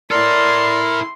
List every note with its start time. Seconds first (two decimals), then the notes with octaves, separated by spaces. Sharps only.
0.11 E4 A4 A#4 D5 C6 F6